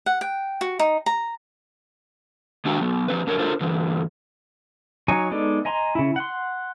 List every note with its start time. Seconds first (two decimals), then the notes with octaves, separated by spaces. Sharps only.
0.06 F#5
0.21 G5
0.61 F#4
0.79 D#4
1.06 A#5
2.65 D#3 G#3 D4 F#4 G5 A#5
2.81 F#3 B3
3.08 F3 C4 B4
3.27 F#2 D4 A#4 C#5
3.39 D4 F4 A4 A#4 C5 C#5
3.61 G2 D3 E3
5.08 F#3 D#4 C#5 G#5
5.31 G#3 B3 D#4 A4 D5
5.65 D#5 G#5 A#5 C6
5.95 C#3 E4
6.16 F#5 C6